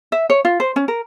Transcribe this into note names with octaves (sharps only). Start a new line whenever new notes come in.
E5
C#5
F4
C5
C#4
A#4